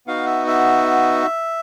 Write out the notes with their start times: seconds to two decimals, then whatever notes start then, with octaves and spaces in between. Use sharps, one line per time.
0.07 B3 D#4 F#4 F5
0.26 E5
0.47 E5